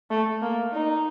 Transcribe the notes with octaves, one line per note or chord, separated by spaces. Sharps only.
A3
A#3
D#4